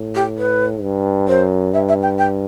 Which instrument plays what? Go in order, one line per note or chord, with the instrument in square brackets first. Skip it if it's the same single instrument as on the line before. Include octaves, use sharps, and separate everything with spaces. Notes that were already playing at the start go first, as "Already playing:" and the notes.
Already playing: [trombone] A2
[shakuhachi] G4
B4
[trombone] G2
[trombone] F#2 [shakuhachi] C5
[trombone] G2 [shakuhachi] E5
[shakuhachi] E5
G5
G5